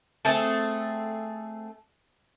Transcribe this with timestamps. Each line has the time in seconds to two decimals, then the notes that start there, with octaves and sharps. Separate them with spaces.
0.25 A3 C4 G#4 A4